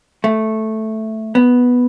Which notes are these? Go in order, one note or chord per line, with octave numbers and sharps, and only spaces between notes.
A3
B3